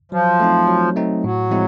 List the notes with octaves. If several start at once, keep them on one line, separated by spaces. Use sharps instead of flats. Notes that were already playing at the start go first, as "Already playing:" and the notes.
F3 F#3
A3 C4 D#4
F#3
A3 C4 D#4
A2 F#3
F3 G#3 C4 E4